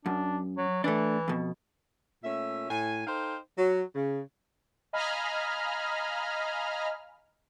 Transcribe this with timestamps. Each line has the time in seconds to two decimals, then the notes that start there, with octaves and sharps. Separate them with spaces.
0.06 F#2 D4
0.57 F#3
0.84 E3 A3 D4
1.28 F2 B2
2.24 A#2 A3 C#4 E5
2.70 A2 G#5
3.07 D#4 A4 C5 F5 G5
3.58 F#3
3.95 C#3
4.93 D#5 F5 G#5 A#5 B5 F6